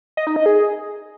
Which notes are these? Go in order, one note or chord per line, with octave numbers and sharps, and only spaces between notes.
D#5
D#4
D#5
G#4